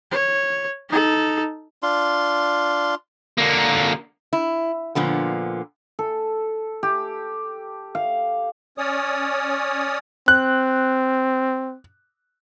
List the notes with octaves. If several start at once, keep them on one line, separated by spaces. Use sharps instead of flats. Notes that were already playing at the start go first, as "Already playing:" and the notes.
C#5
D#4 A4
D4 F4 C6
D3 A#3
E4
A#2 D3 F3 B3
A4
G4
F5
C#4 C#5 D5 D#6
C4 F#6